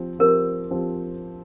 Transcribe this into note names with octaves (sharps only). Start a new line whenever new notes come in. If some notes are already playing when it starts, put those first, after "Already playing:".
Already playing: F3 C4 G4
F3 C4 G4 A#4
F3 C4 G4